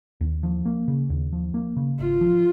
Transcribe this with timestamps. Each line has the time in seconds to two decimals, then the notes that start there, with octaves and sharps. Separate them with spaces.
0.21 D#2
0.43 F3
0.65 A#3
0.88 C#3
1.10 D#2
1.33 F3
1.54 A#3
1.77 C#3
1.99 G#1 F4
2.21 F3